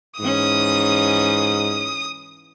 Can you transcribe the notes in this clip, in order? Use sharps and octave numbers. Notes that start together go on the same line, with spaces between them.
G#2 E3 C#4 D#6